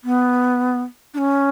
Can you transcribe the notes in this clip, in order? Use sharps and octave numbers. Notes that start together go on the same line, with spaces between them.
B3
D4
C#4